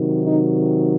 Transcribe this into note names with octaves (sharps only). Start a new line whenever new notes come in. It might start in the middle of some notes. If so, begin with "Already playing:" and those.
Already playing: C3 D#3 F#3
D#4